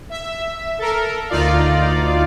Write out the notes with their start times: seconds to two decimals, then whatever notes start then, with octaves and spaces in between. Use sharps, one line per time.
0.10 E5
0.78 A4 A#4
1.29 D2 D#4 F4 D5 F5